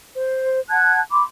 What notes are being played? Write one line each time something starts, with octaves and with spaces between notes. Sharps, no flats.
C5
F#5 A5 F#6 G#6
B5 C6 D6